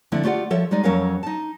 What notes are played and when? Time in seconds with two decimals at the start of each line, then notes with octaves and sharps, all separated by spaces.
0.12 D3 F3 A3 C4 D4 E4
0.24 A3 F4 G4 D5 F#5
0.50 F3 A4 C#5 E5
0.71 G3 G#3 D#4 D5
0.83 F2 F#3 C#4 A#4 C#5 F5
1.23 D#4 A5